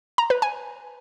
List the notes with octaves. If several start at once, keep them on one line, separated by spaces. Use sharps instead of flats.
A#5
B4
G#5